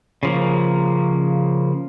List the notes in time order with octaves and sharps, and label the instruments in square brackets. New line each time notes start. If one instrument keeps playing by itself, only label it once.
[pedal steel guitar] C#3 F3 A#3